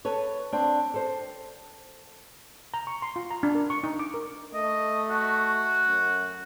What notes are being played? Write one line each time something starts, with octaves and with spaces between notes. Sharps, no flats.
A4 B4 C#5
C4 D4
A4 C5
A#5
C#6
C6
F4
A#5
D4
A#4
C#6
D#4
D6
A#4
A3 D#5
F#4
F#2